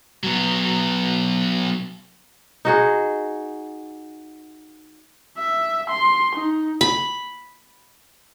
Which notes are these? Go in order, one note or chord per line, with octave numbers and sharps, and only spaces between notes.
F#3 B3
D#4 F#4 G#4
E5
C6
D#4
B5